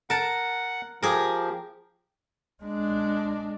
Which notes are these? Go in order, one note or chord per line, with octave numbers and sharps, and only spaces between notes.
A#4 F#5 A5
F3 G4 G#4 A#4
G#3 D4